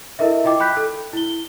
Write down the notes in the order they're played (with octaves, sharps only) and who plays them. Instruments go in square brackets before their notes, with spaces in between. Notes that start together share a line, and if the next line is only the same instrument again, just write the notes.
[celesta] E4 A4 A#4 D#5 E5
E4 F4 D#5 G5 D6
G5 B5 F#6 G6 B6
A4
E4 G7